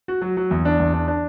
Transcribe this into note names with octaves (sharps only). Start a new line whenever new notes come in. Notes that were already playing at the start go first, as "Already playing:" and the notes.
F#4
F#3
F#3
E2
D4
E2
D4
D4